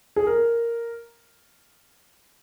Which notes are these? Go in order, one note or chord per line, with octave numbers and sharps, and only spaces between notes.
G#4
A#4